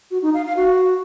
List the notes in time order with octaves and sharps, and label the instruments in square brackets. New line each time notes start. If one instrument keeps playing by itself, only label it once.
[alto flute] F#4
D#4
F5
F5
F#4